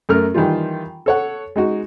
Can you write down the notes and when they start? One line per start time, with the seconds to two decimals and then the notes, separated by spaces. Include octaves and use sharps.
0.09 F#2 A3 A#4 F6
0.34 D#3 E3 G3 F4
1.06 A4 C#5 F#5
1.56 G#3 D#4 F#4